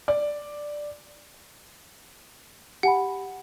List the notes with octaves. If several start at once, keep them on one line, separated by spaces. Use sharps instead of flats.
D5
G4 F#5 G#5 B5